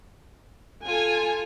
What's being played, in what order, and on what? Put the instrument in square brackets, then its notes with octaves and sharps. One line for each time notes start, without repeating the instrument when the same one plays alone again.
[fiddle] F4 A4 [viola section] G#5